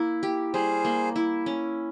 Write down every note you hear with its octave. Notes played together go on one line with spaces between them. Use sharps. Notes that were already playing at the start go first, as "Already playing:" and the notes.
Already playing: A#3 E4
G4
G3 G#4 C5
A#3
E4
C#4